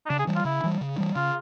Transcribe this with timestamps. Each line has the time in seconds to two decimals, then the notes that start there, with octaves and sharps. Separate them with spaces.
0.06 D#4
0.10 C#3 D4
0.19 G#4
0.27 E3 G3
0.36 F4
0.45 C#3 E4
0.64 E3 G3
0.81 C#3
0.98 E3 G3
1.15 C#3 F4